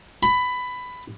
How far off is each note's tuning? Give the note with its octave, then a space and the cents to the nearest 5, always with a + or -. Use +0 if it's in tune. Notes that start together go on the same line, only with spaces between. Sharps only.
B5 +15